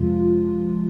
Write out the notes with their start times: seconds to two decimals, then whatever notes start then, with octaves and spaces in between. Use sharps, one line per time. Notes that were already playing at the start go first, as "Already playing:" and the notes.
Already playing: F2 C3 F3 G#3 F4